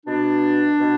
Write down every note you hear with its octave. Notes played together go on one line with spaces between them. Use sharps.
B2 D4
B2